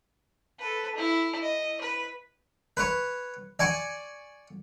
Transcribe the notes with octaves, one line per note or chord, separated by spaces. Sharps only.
A4 B4
E4
D#5
B4
B4 C#5
D5 G#5 C#6